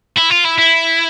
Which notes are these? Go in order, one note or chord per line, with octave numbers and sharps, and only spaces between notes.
E4
F4
E4
E4